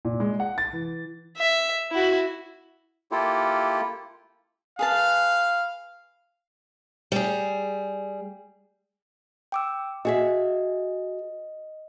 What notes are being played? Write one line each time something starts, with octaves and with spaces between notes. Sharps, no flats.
A#2
G#3
F#5
A6
E3
E5
E4 F#4
A#3 E4 F4 G4 A4
G#4 B4 F5 A5
G3 G#4
G5 D6 E6
F#4 G#4 D#5 E5